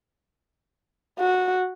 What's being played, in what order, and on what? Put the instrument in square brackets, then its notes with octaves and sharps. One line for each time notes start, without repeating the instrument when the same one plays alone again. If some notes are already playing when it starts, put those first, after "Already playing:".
[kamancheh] F#4